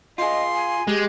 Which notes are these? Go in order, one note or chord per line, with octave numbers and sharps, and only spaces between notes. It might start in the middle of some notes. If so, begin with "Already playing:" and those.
F4 G#4 D#5 C6
G#5
G#3 G4